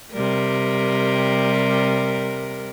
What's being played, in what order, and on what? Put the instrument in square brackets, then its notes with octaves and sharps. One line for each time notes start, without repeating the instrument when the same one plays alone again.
[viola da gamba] C3 G3 A#4